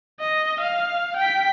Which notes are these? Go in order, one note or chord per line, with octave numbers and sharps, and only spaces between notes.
D#5
F5
G5 B6